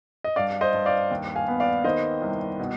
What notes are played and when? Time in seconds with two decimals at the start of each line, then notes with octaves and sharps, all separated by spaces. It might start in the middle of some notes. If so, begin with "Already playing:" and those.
0.24 D#5
0.36 G2 D5 F5
0.61 C5 D#5
0.74 G2
0.86 D5 F5
1.11 D#2
1.35 F5 G#5
1.48 B3
1.60 D5 F5
1.84 D#3 C5 D#5
2.22 C2
2.59 B2